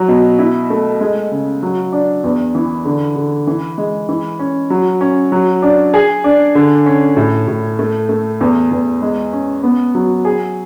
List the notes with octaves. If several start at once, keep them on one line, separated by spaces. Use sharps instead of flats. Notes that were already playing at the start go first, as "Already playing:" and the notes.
Already playing: F#3
B2
E4
A3
G#3
C#3
F#3
D4
E2
E3
D3
D3
E3
G#3
E3
C#4
F#3
C#4
F#3
D4
G#4
D4
D3
C#4
A2
A2
A3
A3
E2
E2
G#3
C#4
B3
F#3
G#4